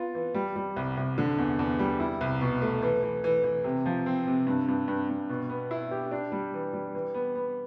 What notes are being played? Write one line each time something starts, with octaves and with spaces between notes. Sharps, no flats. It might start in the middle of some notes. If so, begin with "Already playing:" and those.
Already playing: B3 F4
E3
G3
G3
C2
C2
D3
E2
E2
G3
E4
C2
B2
A3
E3
E3
E3
E3
C3
F3
C4
C3
G2
G2
G2
G2
B2
B3
E4
G4
D4
G3
E3
G3
E3
B3
B3